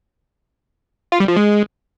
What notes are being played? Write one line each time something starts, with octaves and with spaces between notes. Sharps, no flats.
F4
G3
F3
G#3